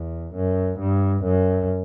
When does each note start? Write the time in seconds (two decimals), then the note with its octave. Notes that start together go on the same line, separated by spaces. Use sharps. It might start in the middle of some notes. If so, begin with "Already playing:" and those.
Already playing: E2
0.35 F#2
0.80 G2
1.25 F#2